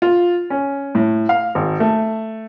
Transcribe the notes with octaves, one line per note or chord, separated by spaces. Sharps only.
F4
C#4
A2
F5
G#1
A3